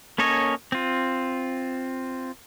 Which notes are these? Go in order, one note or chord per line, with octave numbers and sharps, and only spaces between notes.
A#3 C#4 A4 C#5 D#5
C4 F4